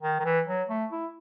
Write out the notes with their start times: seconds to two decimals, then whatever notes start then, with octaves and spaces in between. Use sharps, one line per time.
0.02 D#3
0.20 D#3
0.24 E3
0.47 F#3
0.69 A3
0.91 E4